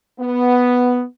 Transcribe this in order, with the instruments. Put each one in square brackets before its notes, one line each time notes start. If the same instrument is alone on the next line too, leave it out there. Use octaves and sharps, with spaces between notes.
[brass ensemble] B3